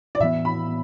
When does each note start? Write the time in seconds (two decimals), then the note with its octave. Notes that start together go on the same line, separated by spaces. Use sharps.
0.15 D5
0.20 A2 E3 B3 E5
0.45 B5